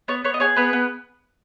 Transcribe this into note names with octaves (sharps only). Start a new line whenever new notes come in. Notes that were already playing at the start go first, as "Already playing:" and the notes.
B3 C#5
B3 C#5
D#5
G#4 C#5
B3 B4
B3